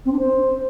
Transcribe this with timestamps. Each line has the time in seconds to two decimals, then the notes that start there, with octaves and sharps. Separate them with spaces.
0.05 C4
0.12 D4
0.19 C5